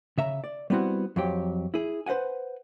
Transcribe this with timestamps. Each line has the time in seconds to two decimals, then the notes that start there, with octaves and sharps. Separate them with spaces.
0.18 C#3 E5 A#5
0.44 D5
0.70 G3 B3 C4 E4 F#4
1.16 F2 F#3 G4
1.74 E4 G#4
2.06 B4 C5 E5 F#5 G#5